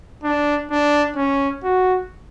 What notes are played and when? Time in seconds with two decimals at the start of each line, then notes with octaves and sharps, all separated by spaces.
0.24 D4
0.71 D4
1.17 C#4
1.64 F#4